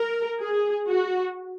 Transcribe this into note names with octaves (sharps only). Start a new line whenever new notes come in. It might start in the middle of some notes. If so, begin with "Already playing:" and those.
Already playing: A#4
G#4
F#4